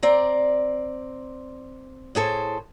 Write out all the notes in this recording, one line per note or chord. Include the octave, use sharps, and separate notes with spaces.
C4 D5 A#5
A2 G#4 A4 C5